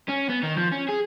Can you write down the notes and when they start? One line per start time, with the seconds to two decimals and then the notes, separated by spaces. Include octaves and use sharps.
0.09 C#4
0.30 B3
0.43 D#3
0.57 F3
0.72 C#4
0.89 G#4